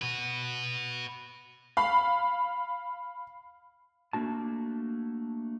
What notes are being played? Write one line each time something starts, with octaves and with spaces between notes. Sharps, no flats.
F#4 B4
F5 B5
A3 A#3 D4 F#4 A5